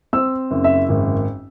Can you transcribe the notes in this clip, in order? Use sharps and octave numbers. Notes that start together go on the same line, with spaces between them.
C4 E6
F#1
E5
G#1